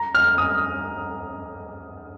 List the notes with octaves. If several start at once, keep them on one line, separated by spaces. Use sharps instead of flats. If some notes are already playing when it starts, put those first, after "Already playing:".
Already playing: A#5
F6
D#6